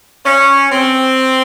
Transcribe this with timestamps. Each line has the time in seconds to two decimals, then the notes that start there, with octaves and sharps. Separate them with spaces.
0.25 C#4
0.71 C4